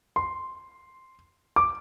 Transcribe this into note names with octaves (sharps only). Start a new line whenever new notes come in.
C6
D6